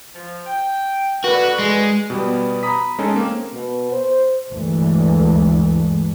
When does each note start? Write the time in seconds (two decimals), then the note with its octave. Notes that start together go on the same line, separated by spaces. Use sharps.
0.15 F3
0.47 G5
1.24 A#2 D3 F#4 B4
1.59 G#3
2.10 B2 G3 B3
2.63 A#5 B5 D#6 B6
2.98 G#3 C#4 D#4 G#4 A4
3.16 A#3 C4
3.53 B2
3.92 C5
4.50 D2 G2 E3 G#3 A3